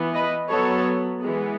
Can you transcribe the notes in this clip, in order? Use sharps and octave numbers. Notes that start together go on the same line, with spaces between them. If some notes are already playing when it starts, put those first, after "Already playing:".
Already playing: E3 B3
B4 D#5
F#3 B3 A4 C#5
E3 G#3 B3